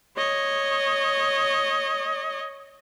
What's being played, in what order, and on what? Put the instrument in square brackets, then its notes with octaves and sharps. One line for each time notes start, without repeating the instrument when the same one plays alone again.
[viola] C#5 D#5